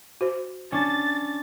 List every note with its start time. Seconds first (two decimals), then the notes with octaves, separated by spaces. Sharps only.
0.21 F#4 C5
0.72 C#4 D4 A6